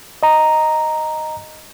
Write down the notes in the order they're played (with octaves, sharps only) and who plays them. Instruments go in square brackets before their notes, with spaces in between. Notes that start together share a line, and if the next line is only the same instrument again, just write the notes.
[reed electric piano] D#5 A#5